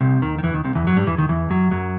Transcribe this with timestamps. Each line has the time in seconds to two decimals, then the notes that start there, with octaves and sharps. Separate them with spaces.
0.01 C2 C3
0.22 D#2 D#3
0.39 D#3
0.43 E2 E3
0.54 D#2 D#3
0.64 C2 C3
0.75 E2 E3
0.87 F#2 F#3
0.97 G2 G3
1.07 E2 E3
1.18 D#2 D#3
1.29 E2 E3
1.50 F#2 F#3
1.71 F#2 F#3